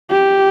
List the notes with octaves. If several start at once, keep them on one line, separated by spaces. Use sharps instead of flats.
G4